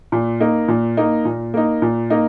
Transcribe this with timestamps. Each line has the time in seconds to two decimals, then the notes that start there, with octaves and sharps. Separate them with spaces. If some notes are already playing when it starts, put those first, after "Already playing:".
0.12 A#2
0.40 A#3 D#4
0.68 A#2
0.97 A#3 D#4
1.25 A#2
1.54 A#3 D#4
1.82 A#2
2.10 A#3 D#4